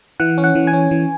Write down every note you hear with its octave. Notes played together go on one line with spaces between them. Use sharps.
E3 F#5
C#4
F#5
E3
G#5
C#4
E3